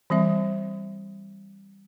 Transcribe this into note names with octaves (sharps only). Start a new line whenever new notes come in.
E3 G3 C4 E5